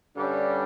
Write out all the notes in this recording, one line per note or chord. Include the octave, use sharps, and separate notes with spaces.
G2 D3 G3 C#4